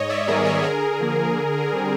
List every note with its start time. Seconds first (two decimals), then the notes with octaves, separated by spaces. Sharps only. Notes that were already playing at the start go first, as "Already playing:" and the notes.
Already playing: G#2 C#5 D#5
0.09 D5 E5
0.28 D#3 G3 B3 G#4 A#4
0.45 G#4 A#4
0.63 D3 G#4 A#4
1.00 F3 A#3
1.37 D3
1.73 G3 C4